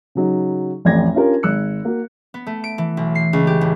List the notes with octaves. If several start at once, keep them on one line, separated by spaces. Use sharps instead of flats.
C#3 F#3 D#4
A1 F2 D5 G#6 A#6
C#4 D4 F4 G4 A#4
G#1 E6 F#6 C#7
A#3 F#4
B3
A3
D7
E3
B1
C7
C#2
G4
A1